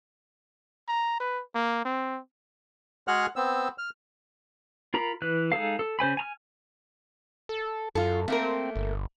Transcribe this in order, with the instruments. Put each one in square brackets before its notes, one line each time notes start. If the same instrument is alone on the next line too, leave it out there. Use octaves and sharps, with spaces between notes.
[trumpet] A#5
B4
A#3
C4
[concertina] G#3 F#4 G#4 F#5 F6 F#6
B3 C4 E6
F6
[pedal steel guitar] F4 A#4 A#5 B5
E3 B4 F#6
G#3 D#4 A4 F5
A4
C#3 C5 G#5 B5
G#5 A#5 F6
[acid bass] A4
[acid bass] F#2 [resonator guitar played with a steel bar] F4 A4
[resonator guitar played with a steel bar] A3 A#3 A#4 [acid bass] C4
[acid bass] G1